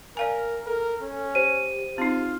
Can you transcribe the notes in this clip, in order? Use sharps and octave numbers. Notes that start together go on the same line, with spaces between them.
A#4 D5 F5 G#5
A4 A#4
C#4
G4 C5 D#7
C4 D#4 F4